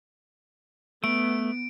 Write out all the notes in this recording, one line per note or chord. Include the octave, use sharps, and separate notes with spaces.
A3 B3 D7